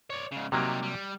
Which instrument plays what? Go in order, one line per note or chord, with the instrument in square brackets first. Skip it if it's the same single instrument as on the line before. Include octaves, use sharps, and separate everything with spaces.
[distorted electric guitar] C#5 D5
G#2 C#3
[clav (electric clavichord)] C3 F#3 A#3 [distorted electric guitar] G3 D#4
[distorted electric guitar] G3